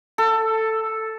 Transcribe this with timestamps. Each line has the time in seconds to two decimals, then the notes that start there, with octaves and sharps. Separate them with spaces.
0.18 A4